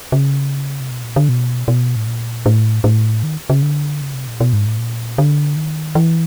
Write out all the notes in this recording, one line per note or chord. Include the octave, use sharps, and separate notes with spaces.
C#3
C3
B2
A#2
D3
B2
B2
A2
A#2
A2
A2
D#3
C#3
D3
C#3
C3
A#2
B2
G#2
A2
A#2
D3
D#3
E3